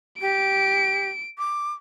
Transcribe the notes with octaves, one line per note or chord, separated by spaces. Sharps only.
G4 D7
D6